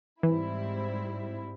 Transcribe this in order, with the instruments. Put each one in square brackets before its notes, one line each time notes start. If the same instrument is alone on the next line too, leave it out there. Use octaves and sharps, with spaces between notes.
[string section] G#2 G3 C4 E4 [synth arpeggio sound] E3